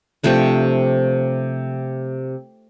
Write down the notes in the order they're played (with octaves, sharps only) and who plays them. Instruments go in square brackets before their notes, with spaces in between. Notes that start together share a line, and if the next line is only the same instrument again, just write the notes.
[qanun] C3 F3 A3 D4